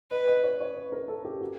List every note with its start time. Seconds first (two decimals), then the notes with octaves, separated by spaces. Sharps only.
0.11 B4 D#5
0.27 D#5
0.44 C#5
0.61 C#5
0.76 B4
0.92 A#4
1.08 A4
1.25 G4
1.41 F#4